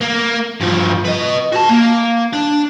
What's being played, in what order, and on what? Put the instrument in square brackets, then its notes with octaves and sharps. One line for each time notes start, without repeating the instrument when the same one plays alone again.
[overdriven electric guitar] A#3
G2 F3
B4 D#5
F#4 A5
A#3
D4